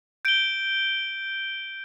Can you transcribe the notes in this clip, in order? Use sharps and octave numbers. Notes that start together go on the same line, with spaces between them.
G6 D7 G7